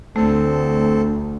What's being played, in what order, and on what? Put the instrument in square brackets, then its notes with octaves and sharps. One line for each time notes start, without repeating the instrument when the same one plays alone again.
[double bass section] D2 [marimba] A3 [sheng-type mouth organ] C4 A4